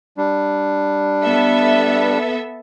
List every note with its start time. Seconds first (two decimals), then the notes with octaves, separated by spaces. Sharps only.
0.17 G3 D4
1.23 B3 A4 E5